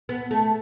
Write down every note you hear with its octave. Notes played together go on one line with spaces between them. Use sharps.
B3
A3